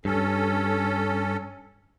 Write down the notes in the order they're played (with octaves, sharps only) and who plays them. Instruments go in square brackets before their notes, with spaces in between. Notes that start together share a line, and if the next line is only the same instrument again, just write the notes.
[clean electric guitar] G2 [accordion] C#4 A4